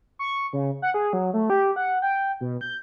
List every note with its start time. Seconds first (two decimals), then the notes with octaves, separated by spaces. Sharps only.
0.19 C#6
0.53 C#3
0.82 F#5
0.94 G#4
1.13 F#3
1.34 A3
1.50 G4
1.76 F#5
2.02 G5
2.41 B2
2.61 G6